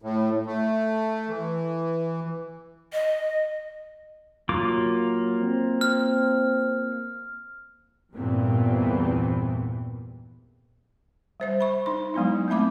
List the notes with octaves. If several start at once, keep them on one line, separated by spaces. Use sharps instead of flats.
A2
A3
E3
D#5
F#3 A#3 F4 D6
C4
F6
E2 G2 A#2 E3 B3 C4
G3 C5 E5
B5 C#6
D#4 C6
F#3 G#3 B3 D#4 E4
A3 C4 E5 B5 D6